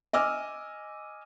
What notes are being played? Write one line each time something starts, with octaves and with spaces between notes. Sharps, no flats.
D#5 G#5 D6 E6 F6